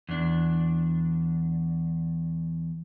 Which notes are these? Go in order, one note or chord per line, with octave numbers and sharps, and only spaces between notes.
E2 D4